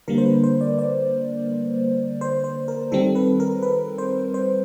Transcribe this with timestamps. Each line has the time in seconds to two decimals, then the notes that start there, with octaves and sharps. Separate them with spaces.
0.08 D3 G3 A#3 A#4
0.18 C5
0.26 B4
0.44 C5
0.61 D5
0.79 D5
2.21 C5
2.44 C5
2.68 A#4
2.92 D#3 G3 C4 A4
3.15 B4
3.40 A#4
3.63 B4
3.98 C5
4.34 C5